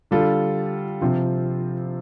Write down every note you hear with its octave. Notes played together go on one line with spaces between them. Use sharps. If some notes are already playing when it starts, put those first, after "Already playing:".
D3 G3 F4 A4
C3 F3 C4 F4